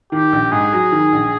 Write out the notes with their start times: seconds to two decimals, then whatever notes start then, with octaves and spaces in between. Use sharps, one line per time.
0.12 D#3 G4
0.32 A#1
0.52 G#2 G#4
0.72 F#3
0.92 D#3
1.12 A#1